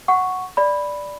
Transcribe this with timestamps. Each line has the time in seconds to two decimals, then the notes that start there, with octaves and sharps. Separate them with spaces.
0.08 F#5 C#6
0.57 D5 B5